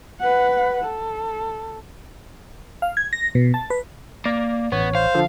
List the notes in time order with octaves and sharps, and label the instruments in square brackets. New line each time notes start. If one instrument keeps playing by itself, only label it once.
[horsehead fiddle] B4 F#5
A4
[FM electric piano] F5
G#6
A#6
B2
A5
B4
[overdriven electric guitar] A#3 [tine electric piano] D5
[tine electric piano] A1 C#5 [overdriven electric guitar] B3
[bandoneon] C5 [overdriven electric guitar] F5
[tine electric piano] D3 F3 A4